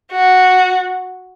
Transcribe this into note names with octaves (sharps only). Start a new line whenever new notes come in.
F#4